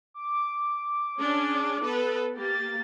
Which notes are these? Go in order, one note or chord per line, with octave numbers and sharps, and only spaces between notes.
D6
C#4 D4 G#4
B3 A4 B4
A#3 G4 A6